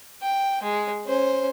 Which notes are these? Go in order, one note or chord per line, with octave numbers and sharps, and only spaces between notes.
G5
G#3
C#4 C5